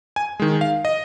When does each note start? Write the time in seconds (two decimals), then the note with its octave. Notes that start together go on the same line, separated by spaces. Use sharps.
0.16 G#5
0.40 D#3 G#3
0.61 F5
0.85 D#5